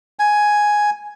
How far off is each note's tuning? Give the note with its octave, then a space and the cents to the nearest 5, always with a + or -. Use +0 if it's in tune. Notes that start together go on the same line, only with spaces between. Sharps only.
G#5 +5